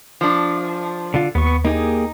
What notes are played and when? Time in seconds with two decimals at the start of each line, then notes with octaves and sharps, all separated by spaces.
0.21 F3 D4
1.14 D3 F4
1.35 D#2 B3 C#6
1.65 A#3 D#4 G4 G#4